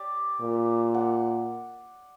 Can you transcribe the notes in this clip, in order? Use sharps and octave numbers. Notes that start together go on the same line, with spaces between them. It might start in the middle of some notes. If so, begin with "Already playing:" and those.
Already playing: G4 D5
A#2
F#5